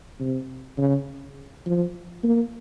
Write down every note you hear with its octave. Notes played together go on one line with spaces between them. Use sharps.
C3
C#3
F3
A#3